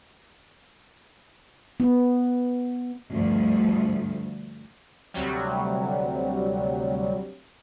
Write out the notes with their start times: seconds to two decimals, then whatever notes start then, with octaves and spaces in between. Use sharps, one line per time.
1.80 B3
3.11 D2 G2 F3
5.14 D2 C3 F#3 G3